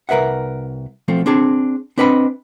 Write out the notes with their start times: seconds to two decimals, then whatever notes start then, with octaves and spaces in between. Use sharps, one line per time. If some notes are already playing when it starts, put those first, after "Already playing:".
0.09 C2 A#4 B4 E5 F#5
1.08 B1 F3 A3 C4
1.26 C4 D4 G#4 A5
1.98 C4 D4 B4 D#5 A#5 B5